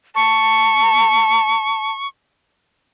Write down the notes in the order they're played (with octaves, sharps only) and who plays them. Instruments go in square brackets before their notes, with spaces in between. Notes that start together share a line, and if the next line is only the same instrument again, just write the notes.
[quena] A5 [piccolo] C#6